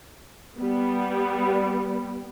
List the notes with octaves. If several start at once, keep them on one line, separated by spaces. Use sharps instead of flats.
G3 B3